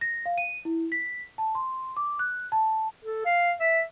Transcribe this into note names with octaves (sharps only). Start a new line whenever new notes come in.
A#6
F5
D#7
E4
B6
A5
C6
D6
F#6
A5
A4
F5
E5